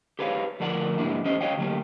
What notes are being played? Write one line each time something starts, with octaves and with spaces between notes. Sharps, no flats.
G4 G#4 B4 C#5 F5
D2 F3 A#4 D5 F#5
G#2 G3 A#3 D4 E4
E2 C#4 G4 C5 D#5
F#4 C#5 D#5 F5 G5
D2 F#3 A#3 G4